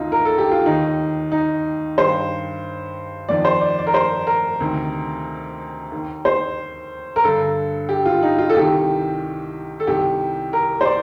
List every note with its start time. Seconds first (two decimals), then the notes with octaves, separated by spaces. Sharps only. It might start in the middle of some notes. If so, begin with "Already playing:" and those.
Already playing: D2 C3 D#3 D#4 F4
0.12 A#4
0.25 A4
0.38 G4
0.52 F4
0.66 D#2 D#3 D#4
1.32 D#4
1.97 G2 D#3 C5
3.29 F2 D#3 D5
3.45 C5
3.61 D5
3.79 D5
3.87 A#4
3.94 C5
4.27 A#4
4.60 D2 C3 D#3
5.92 D#2 D#3
6.25 C5
7.16 A#4
7.23 G2 D3 A4
7.89 G4
8.06 F4
8.22 D#4
8.38 F4
8.49 A4
8.55 C2 C3 D#3 G4
9.80 A4
9.87 C2 C3 D#3 G4
10.53 A#4
10.81 C5
10.85 D5